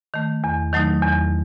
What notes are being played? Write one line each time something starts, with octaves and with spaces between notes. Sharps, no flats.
D#3 A3
E2
D#3 F#3 A3 D#4
E2